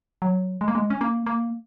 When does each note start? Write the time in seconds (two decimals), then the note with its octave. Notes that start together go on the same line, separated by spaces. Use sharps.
0.22 F#3
0.61 G#3
0.68 A#3
0.75 G#3
0.90 C#4
1.01 A#3
1.27 A#3